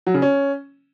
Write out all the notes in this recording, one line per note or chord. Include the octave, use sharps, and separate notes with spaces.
F#3
C#3
C#4